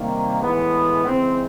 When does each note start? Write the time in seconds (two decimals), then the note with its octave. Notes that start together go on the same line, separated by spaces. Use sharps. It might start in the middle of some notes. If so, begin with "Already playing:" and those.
Already playing: C3 D#3 G3 A#3
0.42 A2 E3 G#3 B3
1.06 C#3 E3 G#3 C4